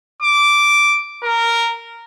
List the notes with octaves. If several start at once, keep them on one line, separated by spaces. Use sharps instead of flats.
D6
A#4